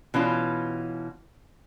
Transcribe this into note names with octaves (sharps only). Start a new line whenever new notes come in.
B2 E3 C#4 F4